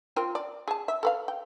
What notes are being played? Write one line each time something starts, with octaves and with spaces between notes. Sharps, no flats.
C4 F4 A#4
D5
G#4 A5
E5
A4 B4 F5
G5